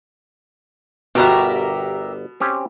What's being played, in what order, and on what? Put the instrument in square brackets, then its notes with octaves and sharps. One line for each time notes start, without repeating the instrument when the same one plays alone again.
[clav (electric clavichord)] G1 F#4 [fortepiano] B2 [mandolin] G4 A#4 E5
[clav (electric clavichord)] C4 C#4 G4